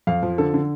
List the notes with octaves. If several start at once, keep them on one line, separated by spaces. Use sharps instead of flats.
F2 F5
F3
D3 A4
D3